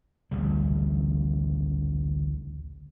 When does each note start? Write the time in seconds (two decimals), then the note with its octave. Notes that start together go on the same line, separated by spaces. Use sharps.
0.31 A1 D2 C#3 G3